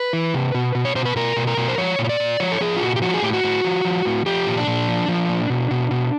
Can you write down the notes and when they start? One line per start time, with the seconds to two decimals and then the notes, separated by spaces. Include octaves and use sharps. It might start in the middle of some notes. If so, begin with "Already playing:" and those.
Already playing: B4
0.13 E3
0.34 C3
0.54 B2
0.75 B2
0.85 C#5
0.95 B2 C5
1.05 B4
1.16 B2 A#4
1.36 B2
1.47 A#4
1.57 B2
1.68 C5
1.78 F3 C#5
1.99 A#2
2.05 C#5
2.09 D5
2.20 A#2
2.40 F3 C#5
2.52 A4
2.61 F3 G#4
2.76 F4
2.81 A#2 F#4
2.96 G4
3.02 F3 F#4
3.14 G#4
3.23 A2 G4
3.33 F#4
3.44 A2
3.64 F3
3.85 F3
4.05 A2
4.26 F3 G4
4.47 A#2
4.57 D4
4.67 A#2
4.88 F3
5.08 F3
5.29 A#2
5.50 B2
5.71 B2
5.91 B2